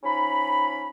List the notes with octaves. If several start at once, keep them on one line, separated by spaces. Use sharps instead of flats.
F3 C#4 D#4 B5